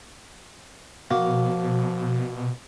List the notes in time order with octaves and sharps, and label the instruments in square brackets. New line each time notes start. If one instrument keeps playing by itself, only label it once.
[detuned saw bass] B2 [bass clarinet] F3 [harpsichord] A#3 [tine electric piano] F#4